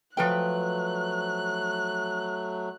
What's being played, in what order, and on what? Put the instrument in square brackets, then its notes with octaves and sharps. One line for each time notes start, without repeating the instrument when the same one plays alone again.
[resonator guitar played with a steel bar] F3 B4 G5 [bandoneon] F#3 A3 [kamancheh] F#6